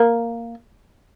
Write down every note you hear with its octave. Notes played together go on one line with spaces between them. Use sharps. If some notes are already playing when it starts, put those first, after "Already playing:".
Already playing: A#3